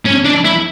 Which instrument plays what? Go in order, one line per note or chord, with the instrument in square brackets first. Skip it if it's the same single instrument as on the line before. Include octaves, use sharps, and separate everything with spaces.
[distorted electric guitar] C#4
D4
E4